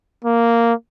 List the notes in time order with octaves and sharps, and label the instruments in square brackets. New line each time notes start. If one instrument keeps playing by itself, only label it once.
[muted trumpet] A#3